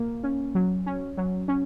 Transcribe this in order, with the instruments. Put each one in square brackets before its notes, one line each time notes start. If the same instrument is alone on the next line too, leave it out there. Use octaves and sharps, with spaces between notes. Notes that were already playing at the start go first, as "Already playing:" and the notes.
Already playing: [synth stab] A#2 A#3
C#4
F#3
C#4
F#3
C#4